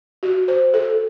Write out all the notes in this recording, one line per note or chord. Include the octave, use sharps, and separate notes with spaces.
F#4
C5
A4